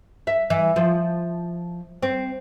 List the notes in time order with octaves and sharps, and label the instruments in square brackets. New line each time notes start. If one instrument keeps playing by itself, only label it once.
[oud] E5
E3
F3
C4